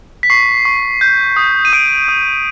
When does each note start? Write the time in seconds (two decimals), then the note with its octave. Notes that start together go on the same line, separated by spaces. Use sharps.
0.23 B6
0.30 C#6 C7
0.65 C#6
1.01 G6
1.36 D#6
1.65 D#7
1.73 D#6 D7
2.08 D#6